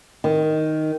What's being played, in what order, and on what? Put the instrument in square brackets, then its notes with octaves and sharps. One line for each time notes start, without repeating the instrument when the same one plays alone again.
[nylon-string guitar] D#3